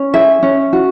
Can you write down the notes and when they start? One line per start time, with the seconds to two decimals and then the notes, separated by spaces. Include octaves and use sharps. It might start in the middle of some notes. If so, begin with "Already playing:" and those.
Already playing: C#4
0.13 G#4 E5
0.43 C#4
0.73 F#4